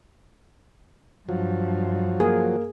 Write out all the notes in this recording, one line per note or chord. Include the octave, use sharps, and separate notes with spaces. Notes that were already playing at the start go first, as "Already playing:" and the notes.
G2 F3 F#3
A#3 G#4